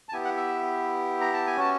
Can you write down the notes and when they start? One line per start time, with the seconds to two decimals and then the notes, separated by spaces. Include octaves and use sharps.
0.09 A5
0.12 B3 E4 G4 G#5
0.25 F#5
0.37 E5
1.21 A#5
1.33 A5
1.47 G#5
1.56 C#4 F#4 A5